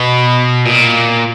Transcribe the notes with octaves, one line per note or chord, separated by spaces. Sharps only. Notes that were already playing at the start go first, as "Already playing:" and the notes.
Already playing: B2
A#2